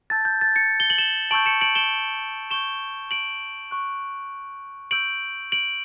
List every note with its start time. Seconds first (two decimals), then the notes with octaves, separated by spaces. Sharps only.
0.10 A5 E6 G6 A6
0.25 G6
0.41 A6
0.56 A6 C#7
0.80 G7
0.90 F#7
0.98 E7 G7
1.31 A5 C#6 E6 G6 D7 F#7
1.46 C#7 E7
1.61 D7 F#7
1.75 E7 G7
2.51 C#6 G6 E7 G7
3.11 D7 F#7
3.71 C#6 F#6
4.91 C#6 E6 G6 D7 F#7
5.52 D7 F#7